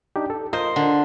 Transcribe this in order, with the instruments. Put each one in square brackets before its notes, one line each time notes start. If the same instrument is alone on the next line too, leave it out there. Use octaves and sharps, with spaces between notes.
[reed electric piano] D4 D#4 G4
A4
[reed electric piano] F4 A#4 D#5 [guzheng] C5
[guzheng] D3